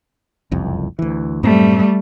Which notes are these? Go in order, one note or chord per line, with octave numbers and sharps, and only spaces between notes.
F#1 C2 F2
D2 E3
F#2 A2 G3 A3 C4